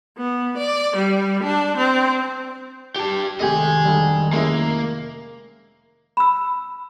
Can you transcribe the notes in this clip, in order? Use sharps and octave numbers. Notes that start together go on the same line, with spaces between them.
B3
D5
G3
D4
C4
G4 A5
F1 D#3 A3 C4 G4 D#5 G#5
D3 G3
G#3 A#3 C#4 E4
B5 E6